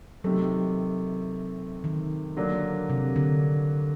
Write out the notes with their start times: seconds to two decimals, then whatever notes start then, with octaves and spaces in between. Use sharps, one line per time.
0.24 C3 D#3 F#3 A3
1.84 D#3
2.37 D3 F#3 A#3 D4
2.90 C3
3.16 D3